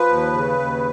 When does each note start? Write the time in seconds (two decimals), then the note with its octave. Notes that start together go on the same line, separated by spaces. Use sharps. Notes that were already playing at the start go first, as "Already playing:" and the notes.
Already playing: F3 B4
0.09 D#2
0.33 C#3
0.59 D#2